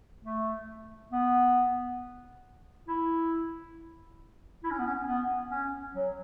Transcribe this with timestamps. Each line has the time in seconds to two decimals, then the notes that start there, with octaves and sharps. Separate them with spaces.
0.24 A3
1.12 B3
2.88 E4
4.63 E4
4.71 C#4
4.79 B3
4.86 C#4
5.07 B3
5.51 C#4
5.95 F#3